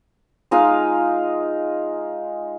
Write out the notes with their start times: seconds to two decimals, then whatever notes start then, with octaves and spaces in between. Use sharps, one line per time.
0.51 G#3 D#4 F4 F5